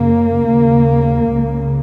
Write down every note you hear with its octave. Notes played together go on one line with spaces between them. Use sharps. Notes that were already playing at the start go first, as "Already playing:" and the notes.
Already playing: F#2 C#3 A#3
D#2 C#3
C#2 C#3